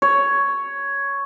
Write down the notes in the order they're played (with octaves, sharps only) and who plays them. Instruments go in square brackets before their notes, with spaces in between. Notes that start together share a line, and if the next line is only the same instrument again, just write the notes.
[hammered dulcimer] C#5